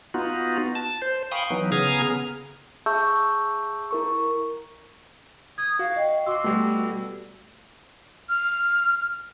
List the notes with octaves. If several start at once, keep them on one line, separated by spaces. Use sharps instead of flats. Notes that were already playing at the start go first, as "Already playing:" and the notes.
B3 D#4 F4 F#4
A5
C5
F5 G5 G#5 B5 C#6 D#6
E3 F#3 B3 D#4
C#3 B3 G#4 G#5 A#5 F6
G#4 E5 A5 C#6 E6 G6
E4 A#4 C#6
D#6 G#6
F#4 F5
D#5 G5
F#4 C6 D6 E6
B2 G3 A3
F6